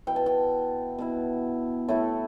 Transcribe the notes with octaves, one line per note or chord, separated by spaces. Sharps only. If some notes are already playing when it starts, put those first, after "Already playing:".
B2 B3 E4 G5
A5
G5
B2 B3 E4
A2 A3 E4